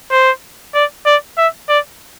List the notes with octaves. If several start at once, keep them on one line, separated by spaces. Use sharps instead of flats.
C5
D5
D5
E5
D5